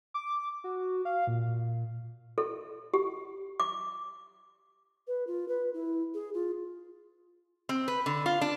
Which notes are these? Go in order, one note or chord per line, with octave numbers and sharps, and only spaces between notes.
D6
F#4
F5
A#2
A4
G4
D6
B4
F4
B4
E4
G#4
F4
C4
B4
D3
F4
D4